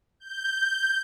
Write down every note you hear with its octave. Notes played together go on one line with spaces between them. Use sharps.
G6